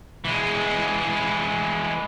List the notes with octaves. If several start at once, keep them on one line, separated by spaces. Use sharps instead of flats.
E3 G#3